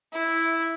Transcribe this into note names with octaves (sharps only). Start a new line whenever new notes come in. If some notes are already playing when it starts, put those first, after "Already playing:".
E4